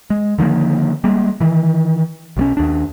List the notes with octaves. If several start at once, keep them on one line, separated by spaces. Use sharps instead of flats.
G#3
D3 D#3 F3 A#3
G3 G#3 A#3
D#3 E3
B1 G3 C#4
D#2 D4